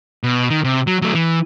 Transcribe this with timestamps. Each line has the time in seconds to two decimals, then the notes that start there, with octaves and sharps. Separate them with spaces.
0.24 B2
0.50 D#3
0.64 C3
0.87 F#3
1.02 F#3 A3
1.15 E3